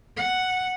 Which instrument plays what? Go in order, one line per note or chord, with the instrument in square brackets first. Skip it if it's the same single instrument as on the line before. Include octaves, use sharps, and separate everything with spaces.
[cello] F#5